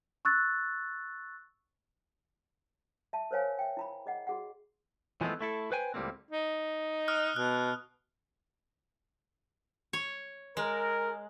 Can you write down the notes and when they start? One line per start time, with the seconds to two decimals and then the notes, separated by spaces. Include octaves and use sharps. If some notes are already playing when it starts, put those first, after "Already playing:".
0.25 C#6 E6 F#6 A6
3.13 E5 A5
3.31 A#4 C5 C#5 F5 G#5
3.59 E5 G5
3.77 E4 A#5 B5
4.06 G#4 D#5 F#5
4.27 F#4 G#4 F#5
5.21 E3 F3 G#3 A3 B3 C4
5.41 A3 E4 A4
5.72 B4 C5 G5 G#5
5.94 C#2 A2 G3 G#3 A#3 C4
6.30 D#4
7.08 D#6 F6 F#6
7.36 B2 F#6
9.93 C#5
10.57 G#3 A#4